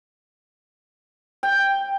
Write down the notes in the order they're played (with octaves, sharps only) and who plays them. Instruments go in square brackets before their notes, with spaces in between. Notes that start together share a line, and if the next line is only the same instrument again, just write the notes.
[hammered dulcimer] G5